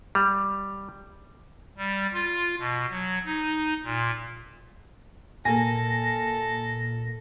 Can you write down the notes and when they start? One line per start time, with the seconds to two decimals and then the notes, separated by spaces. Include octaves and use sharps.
0.15 G3
1.77 G3
2.14 F4
2.59 B2
2.90 F#3
3.26 D#4
3.84 A#2
5.45 A#2 A#3 A4 G#5 A#6